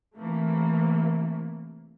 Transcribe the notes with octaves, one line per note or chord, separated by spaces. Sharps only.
C3 E3 A3 A#3